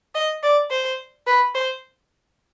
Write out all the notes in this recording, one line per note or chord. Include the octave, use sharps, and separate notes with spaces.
D#5
D5
C5
B4
C5